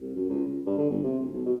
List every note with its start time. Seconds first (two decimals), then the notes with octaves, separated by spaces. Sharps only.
0.01 C2
0.16 F#2
0.29 C#2
0.46 C#2
0.66 G2
0.78 D3
0.90 G1
1.03 C3
1.19 D1
1.33 B1
1.46 B2